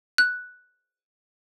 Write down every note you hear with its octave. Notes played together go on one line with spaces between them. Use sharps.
F#6